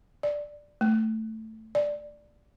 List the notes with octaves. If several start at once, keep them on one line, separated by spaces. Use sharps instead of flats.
D5
A3
D5